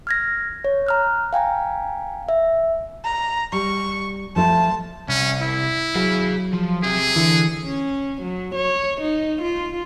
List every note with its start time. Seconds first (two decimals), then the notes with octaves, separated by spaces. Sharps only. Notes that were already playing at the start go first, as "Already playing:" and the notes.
0.07 F6 G#6 A#6
0.64 C#5
0.87 A#5 F6 F#6
1.33 F5 G5 G#5 A#5
2.29 E5
3.04 A#5
3.52 G3 C#6
4.36 F3 A3 F4 A5
5.09 C2 C#4
5.42 E4
5.96 F#3 G#4 F5
6.53 F3
6.83 C4 G4 G#4
7.16 D3 E3
7.65 C#4
8.22 F#3
8.55 C#5
9.02 D#4
9.42 F4